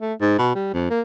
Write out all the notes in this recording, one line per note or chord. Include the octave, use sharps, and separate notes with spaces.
A3
G#2
B2
G3
F2
A#3